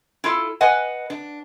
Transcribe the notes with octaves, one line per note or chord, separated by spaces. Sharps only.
E4 F4 A4
B4 D#5 F#5 G#5
D4